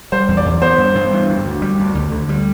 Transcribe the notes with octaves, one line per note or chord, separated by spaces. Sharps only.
G3 C5
E2
D5
E2
B3 C5
G2
G2
E3
D2
D2
G3
D2
D2
D3
G3